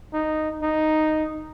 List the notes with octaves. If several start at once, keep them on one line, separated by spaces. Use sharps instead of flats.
D#4
D#4